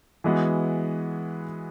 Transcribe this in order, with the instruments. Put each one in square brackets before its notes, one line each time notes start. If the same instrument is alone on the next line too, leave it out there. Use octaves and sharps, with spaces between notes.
[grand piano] E3 G#3 B3 F#4